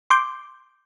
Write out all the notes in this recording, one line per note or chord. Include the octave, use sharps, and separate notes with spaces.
C6 D6 G6